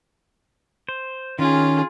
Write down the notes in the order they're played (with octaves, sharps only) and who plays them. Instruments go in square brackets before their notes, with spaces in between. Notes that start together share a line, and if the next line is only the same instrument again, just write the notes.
[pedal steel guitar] C5
[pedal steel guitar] D#3 [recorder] C#4 [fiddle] F4 G#4